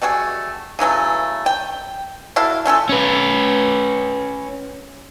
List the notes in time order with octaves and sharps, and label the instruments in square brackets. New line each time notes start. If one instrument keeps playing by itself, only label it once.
[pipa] G3 A3 F#4 G#4
C#3 E3 F#3 A3
G5
E4 F#4 A4 F5
A3 C#4 F4 A4
[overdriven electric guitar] C#4 B4